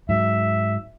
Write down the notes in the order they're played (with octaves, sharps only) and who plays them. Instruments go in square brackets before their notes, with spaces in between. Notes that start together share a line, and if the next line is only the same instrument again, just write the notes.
[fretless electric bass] G#2 F#3 [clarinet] E5